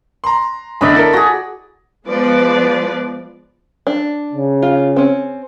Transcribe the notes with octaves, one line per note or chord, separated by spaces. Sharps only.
A#5 C6
B1 D3 A3 D5 D#5 B5
E4 A4 A#4
F#4 G#4 A#6
F3 G#3 B3 B4 D5
D4
C#3
F4
C4 C#4